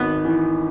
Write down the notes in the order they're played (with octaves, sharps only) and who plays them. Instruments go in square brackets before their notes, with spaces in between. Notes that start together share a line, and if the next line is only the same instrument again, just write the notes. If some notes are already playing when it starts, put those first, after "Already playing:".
Already playing: [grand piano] G#1 [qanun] B3
[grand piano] E3